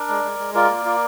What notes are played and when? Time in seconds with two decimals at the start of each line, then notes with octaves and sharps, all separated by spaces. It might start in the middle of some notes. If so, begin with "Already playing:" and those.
Already playing: D4 A#4 D5
0.09 G#3
0.24 G#3
0.39 G#3
0.54 F4 A#4 D5
0.70 A#3
0.85 F4